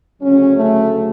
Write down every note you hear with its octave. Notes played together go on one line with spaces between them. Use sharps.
D2 C#3 F#3 C#4
A3